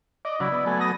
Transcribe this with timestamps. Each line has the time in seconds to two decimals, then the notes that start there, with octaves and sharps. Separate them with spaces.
0.25 D5 D#5
0.40 C#3 F#3 E4 D5
0.52 B3
0.66 F#3 A3 B3 G#5
0.81 D#6 A#6